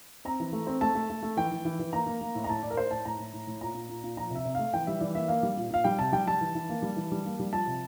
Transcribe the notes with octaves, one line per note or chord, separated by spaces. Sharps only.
C4 A#5
E3
A3
C4
A3 A5
A3
A3
A3
E3 G5
E3
E3
E3
A#3 A#5
A#3
A#3
A2
A#5
A2 A5
A2 D5
A#4
A2 C5
A2 A5
A2 A#5
A2
A2
A2
A#2 A#5
A#2
A#2
A#2
F3 A#5
C3
E5
C3
A3 F5
E3 G5
G3 E5
E3 D5
A#3 E5
A#3 F5
G3
A#2
A#2 F5
G3 G5
C3 A5
G3 G5
G3 A5
E3
E3
A#3
G3
E3
G3
A#3
G3
F3 A5
C3